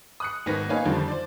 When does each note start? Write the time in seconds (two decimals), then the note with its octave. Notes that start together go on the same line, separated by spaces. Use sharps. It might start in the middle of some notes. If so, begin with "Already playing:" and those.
0.20 D#6 F#6 C#7
0.46 G#1 D#3 B3 B4 A#6
0.69 A#3 D#4 B4 C#5 F5 G#5
0.85 F2 D3 D#3 F3 G3
1.08 C5 D5